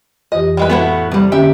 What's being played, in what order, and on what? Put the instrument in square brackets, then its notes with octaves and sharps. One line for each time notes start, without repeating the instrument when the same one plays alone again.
[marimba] F2 E3 G4 [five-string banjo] D#5
[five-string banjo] G3 G#3 B4
[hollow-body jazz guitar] A2 A3 B3 [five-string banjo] E4 F#4
[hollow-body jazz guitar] C2 G3
[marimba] D3 A#3 C#4 [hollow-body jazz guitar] G4 [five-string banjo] E5